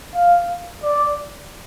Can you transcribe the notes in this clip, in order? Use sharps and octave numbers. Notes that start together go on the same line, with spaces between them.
F5
D5